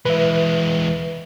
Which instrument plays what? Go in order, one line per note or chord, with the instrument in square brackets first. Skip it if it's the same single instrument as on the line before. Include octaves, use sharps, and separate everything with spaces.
[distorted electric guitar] E3 G#3 [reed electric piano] B4 E5